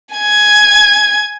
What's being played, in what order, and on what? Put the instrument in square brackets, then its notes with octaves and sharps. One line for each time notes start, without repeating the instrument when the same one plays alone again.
[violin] G#5 G#6